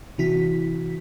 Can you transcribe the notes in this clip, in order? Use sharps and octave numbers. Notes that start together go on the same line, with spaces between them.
C3 E3 E4 F#4 B6